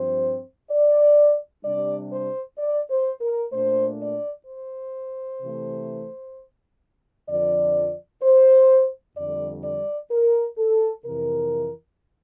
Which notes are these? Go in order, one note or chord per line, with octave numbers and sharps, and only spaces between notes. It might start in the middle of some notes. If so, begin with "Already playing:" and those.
Already playing: G2 F3 C4 C5
D5
C3 G3 D4 D5
C5
D5
C5
A#4
A#2 A3 D4 C5
D5
C5
C3 E3 A3
F2 D3 F3 D5
C5
F2 D3 G3 D5
D5
A#4
A4
F2 C3 E3 A#4